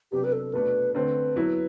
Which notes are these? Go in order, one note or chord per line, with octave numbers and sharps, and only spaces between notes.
C3 F#3 B3 D4 G4
B4
A4
B2 A3 D4 B4
D3 A3 C4 B4
F#3 B3 E4